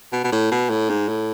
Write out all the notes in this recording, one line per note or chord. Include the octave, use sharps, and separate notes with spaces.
B2
B2
A2
B2
A2
G#2
A2